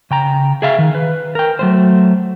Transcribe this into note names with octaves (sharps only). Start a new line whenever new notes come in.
C#3 G5 A#5
G#4 E5 F5
D#3
B4
A#4 G5
F#3 A3 C5